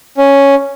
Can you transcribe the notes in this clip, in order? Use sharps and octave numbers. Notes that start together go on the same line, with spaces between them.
C#4